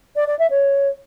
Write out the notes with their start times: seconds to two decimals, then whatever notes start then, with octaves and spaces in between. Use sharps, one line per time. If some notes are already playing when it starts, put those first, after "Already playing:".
0.16 D5
0.27 D5
0.39 E5
0.50 C#5